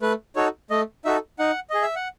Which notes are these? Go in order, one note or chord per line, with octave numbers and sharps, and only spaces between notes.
A3 B4
D#4 F#4 A4 C#5
A3 D#5
D#4 F#4 A4 E5
D#4 F#5
G#4 D#5
E5
F#5